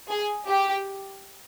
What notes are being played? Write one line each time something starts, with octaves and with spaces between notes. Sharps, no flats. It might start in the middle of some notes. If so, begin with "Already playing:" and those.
G#4
G4